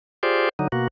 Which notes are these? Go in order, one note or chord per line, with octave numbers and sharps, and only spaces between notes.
F4 G4 G#4 C5 D5
D3 F#3 D#4
B2 A#3 F#4